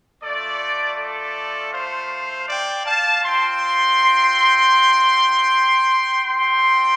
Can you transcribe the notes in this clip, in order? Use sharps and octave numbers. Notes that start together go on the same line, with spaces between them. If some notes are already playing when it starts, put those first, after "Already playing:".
A3 F4 A4 D5
A4 D5
C5 F5
D5 G5
F5 A5
C4 F4 G5 C6
C4 F4 G5 C6